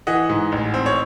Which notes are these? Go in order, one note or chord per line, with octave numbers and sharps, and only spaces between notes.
E3 D#5 F#5
G#2
A1
C4
C#5